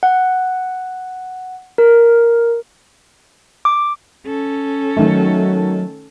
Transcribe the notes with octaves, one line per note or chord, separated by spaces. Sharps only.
F#5
A#4
D6
C#4 A4
D#3 F#3 A3